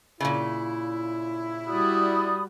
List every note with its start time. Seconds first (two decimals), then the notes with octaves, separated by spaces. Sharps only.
0.20 A#2 C#3 E4
1.68 G3 F#4 D5 B5 D#6